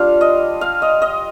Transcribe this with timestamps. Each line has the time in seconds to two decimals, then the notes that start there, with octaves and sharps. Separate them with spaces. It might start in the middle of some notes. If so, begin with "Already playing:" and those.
Already playing: G3 D4 F4 F5
0.21 D#5
0.61 F5
0.82 D#5
1.02 D#5